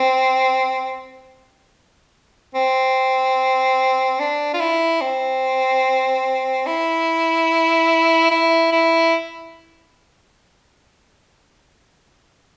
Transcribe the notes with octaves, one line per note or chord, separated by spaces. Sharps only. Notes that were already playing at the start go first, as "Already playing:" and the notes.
Already playing: C4
C4
D4
F4
E4
C4
E4
E4
E4